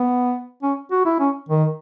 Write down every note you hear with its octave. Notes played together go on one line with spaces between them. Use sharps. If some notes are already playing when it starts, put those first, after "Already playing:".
Already playing: B3
C#4
F#4
E4
C#4
D#3